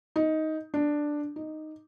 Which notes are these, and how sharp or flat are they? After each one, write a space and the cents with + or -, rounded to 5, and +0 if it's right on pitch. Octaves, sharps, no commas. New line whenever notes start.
D#4 +10
D4 +5
D#4 -5